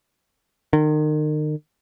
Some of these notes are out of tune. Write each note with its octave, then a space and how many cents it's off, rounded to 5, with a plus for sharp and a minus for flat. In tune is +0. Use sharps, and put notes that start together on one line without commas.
D#3 -35